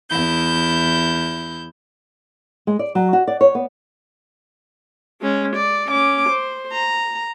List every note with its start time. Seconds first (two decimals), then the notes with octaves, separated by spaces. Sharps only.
0.10 E2 E4 G6
2.67 G#3
2.79 D5
2.95 F#3
3.13 F#4
3.27 D5
3.41 C#5
3.55 B3
5.21 G#3 C#4
5.56 D5
5.88 C#4 D6
6.29 C5
6.72 A#5